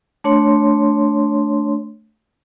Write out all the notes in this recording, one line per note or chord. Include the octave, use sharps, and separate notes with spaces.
A3 D4 C#5 C6